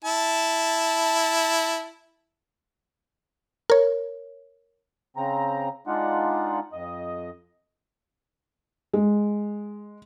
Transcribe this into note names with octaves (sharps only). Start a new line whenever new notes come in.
E4 A5
A#4 C#5
C#3 C4 A#5
G#3 D4 D#4 F4 F#5
F2 D#5
G#3